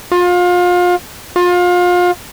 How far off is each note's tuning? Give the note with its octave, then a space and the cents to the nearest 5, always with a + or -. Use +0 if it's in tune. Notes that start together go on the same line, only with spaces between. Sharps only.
F4 +30
F4 +30